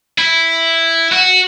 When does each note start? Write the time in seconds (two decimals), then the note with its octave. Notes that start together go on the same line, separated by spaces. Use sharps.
0.18 E4
1.12 F#4